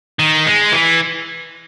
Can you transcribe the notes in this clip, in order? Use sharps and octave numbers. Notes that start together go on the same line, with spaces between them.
D#3
G#3
E3